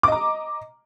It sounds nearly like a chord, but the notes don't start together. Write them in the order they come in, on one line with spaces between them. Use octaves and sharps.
D6 D#5 A#5